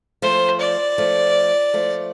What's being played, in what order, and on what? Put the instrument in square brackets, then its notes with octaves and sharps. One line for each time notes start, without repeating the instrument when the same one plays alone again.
[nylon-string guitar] F3 A3 [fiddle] C5
[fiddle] D5
[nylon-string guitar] F3 A3
F3 A3